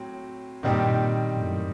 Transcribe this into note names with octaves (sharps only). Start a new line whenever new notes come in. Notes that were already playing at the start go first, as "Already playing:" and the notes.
Already playing: A2 F#3 C4
G2 A#2 D#3 G3 C4 D#4 G4
F#2 A2